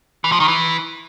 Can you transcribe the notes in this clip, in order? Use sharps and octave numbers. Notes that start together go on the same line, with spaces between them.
E3
F3
D#3
E3